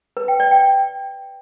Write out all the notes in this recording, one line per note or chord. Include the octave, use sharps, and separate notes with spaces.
B4
G5
D5
G5